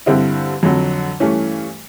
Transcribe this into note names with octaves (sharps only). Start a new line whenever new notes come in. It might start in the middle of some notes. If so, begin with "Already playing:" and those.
G2 D3 G3 C4 E4
F2 D3 F#3
G2 E3 A3 C#4